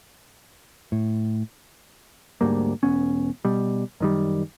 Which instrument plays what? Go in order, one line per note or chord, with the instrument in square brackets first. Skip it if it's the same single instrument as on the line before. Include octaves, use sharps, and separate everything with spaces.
[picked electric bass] A2
D2 G#2 G3 A#3
E1 B3 C#4
B2 G3
F#2 D#3 G3